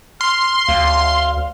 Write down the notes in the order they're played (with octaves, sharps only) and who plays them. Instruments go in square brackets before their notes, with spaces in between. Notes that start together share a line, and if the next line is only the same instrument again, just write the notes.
[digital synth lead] C6 [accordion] F6
[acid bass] D2 [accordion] F5